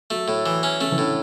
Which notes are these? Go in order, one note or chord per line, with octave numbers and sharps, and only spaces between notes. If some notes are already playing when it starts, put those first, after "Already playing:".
F#3 A3
A2
E3
C#4
C#3 A3
E3
A2 D3